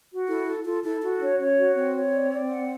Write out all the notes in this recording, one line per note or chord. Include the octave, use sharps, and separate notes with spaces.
F#4
E4 A4
A4
F4 A4
E4 A4
E4 F#4
D4 C#5
C#4 C#5
F#4
C4 C#5
C#5
D5
D5
F#5